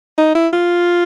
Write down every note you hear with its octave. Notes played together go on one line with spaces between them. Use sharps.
D#4
E4
F4